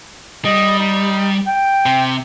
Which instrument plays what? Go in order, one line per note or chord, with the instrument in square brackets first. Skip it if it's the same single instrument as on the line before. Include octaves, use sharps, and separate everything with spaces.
[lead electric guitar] G3 [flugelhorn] D#5
[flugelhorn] D#4
G5
[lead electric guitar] C3